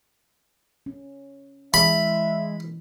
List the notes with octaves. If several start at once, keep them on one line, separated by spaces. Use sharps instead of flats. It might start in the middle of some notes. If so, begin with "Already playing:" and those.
C#4
E3 G#3 E5 B5